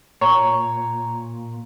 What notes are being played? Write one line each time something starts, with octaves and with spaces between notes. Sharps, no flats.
A#2 C#5 A#5